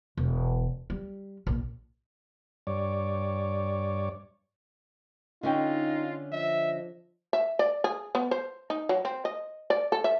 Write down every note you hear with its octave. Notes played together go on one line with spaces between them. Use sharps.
E1
G3
A#1
G2 C#5 D5
D3 C#4 D#4 F4 D#5 G5
F3 D#5 E5
E5
D5
G#4
B3
C5
D#4
F#3
C4
D#5
D5
A4
E5